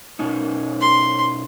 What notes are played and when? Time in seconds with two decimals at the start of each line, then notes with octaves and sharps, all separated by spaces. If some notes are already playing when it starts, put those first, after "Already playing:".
0.19 B2 C#4 D#4
0.81 C6